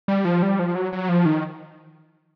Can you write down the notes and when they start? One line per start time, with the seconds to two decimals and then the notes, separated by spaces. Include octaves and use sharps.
0.08 G3
0.25 F3
0.42 G3
0.59 F3
0.75 F#3
0.93 F#3
1.09 F3
1.26 D#3